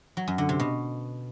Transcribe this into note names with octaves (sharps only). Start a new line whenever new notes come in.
F#3
F#2
D3
C3
B2